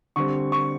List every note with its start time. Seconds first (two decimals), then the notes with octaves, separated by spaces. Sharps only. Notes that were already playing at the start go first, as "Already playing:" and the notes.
0.16 D3 G3 C4 C#6
0.52 C#6